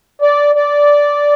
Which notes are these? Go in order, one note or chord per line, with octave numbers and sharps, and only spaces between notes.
D5
D5